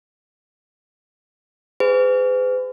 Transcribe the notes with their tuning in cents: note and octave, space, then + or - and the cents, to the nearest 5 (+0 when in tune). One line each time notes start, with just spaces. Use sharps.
G#4 -15 B4 +45